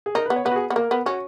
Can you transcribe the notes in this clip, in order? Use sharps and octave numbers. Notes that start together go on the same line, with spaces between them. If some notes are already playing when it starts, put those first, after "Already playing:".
G#4
D#4 A#4
B4
B3
C#5
B3 B4
F#4
G#4
B3
A#3 A#4
B3
C#4 F#4